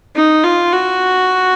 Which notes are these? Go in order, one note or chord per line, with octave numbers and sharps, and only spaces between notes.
D#4
F4
F#4